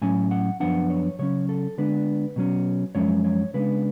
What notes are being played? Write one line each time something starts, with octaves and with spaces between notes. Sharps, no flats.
A2 F#3 C#4 G#5
F#5
F#2 F3 B3 D4 F#5
C#5
C#3 F#3 C#4 C#5
A4
D3 G#3 B3 D4 B4
B2 F#3 C#4
F#2 F3 G#3 C#4 C#5
C#5
C#3 G#3 B3 D4 B4